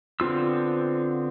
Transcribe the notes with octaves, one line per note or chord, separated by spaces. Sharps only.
D3 B3 C4 F4 E6